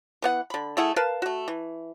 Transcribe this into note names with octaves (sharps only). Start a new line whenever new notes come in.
E3 B3 F#5
D3 B5
A3 E4 G#4 F#5
A#4 B4 F5 A5
A3 F#4
E3